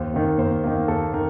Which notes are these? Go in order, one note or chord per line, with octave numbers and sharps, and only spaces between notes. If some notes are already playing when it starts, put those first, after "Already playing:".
Already playing: D#2 C5
D#3 A#3
D#2 C5
D#3 A#3
D#2 A4
D#3 A#4